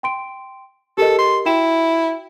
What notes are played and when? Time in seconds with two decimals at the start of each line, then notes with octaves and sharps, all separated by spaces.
0.03 G5 C6 D7
0.98 G4 A4 A#4 D#5
1.18 C6
1.46 E4 F#4 G5 E7